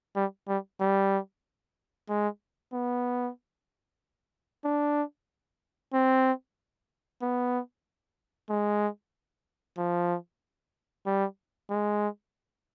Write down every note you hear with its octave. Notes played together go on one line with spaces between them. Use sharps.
G3
G3
G3
G#3
B3
D4
C4
B3
G#3
F3
G3
G#3